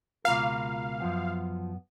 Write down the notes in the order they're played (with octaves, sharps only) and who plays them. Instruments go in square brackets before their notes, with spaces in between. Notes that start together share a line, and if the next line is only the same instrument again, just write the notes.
[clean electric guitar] C#2 B2 A#3 F4 A#4 [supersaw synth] F5
[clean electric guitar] F#2 F3 B3